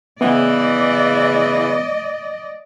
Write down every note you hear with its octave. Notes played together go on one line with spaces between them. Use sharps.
C#3 E3 B3 D5 D#5